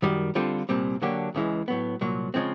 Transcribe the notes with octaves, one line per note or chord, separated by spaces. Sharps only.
F#2 D#3 G3
D3 G3 C4 F4 A4
C2 A#2 G3 C4
D3 F#3 A#3 D4 G4
C#2 C#3 E3 G#3
A2 F#3 B3
C2 A#2 F#3
C#3 F3 G#3 C4